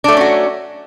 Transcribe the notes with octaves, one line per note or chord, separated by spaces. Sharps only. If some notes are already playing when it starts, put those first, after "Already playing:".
F#3 A3 C#4 D4 F#4